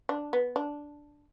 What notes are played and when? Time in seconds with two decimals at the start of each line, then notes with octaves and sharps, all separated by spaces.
0.09 D4
0.33 B3
0.56 D4